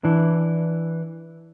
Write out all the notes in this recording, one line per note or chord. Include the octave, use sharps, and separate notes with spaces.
E3 D4